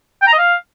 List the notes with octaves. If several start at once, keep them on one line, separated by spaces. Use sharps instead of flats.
G5
A#5
D#5
F5